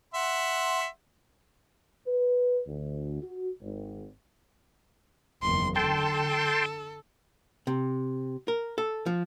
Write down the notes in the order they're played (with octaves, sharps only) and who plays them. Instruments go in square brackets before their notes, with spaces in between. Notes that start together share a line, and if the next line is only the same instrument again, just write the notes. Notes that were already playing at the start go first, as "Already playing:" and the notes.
[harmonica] E5 F#5 C6
[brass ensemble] B4
D2
F#4
G#1
[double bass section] F#1 E2 D#3 [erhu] C6
[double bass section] D3 [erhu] A4 [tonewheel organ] G5 A5 C6
[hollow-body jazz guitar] C3
A#4
A4
F3